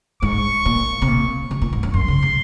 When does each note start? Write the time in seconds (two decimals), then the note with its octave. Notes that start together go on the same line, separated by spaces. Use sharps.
0.22 G#2 C#6
0.65 A#2
1.02 C3
1.08 A#2
1.51 C3
1.62 A#2
1.73 G#2
1.83 F#2
1.94 F#2 C6
2.08 C#3
2.23 C3